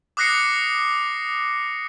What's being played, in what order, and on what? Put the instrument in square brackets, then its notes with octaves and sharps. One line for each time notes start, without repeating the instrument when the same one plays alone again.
[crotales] D6 D#6 F#6 A#6 C7 C#7